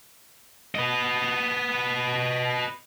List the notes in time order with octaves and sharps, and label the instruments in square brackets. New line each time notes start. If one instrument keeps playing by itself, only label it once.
[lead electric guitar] B4 D#5